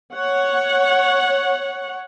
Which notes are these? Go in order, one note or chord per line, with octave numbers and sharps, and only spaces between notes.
C#5 F#5